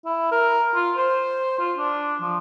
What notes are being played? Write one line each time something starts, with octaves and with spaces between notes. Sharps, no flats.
E4
A#4
F4
C5
F4
D4
F3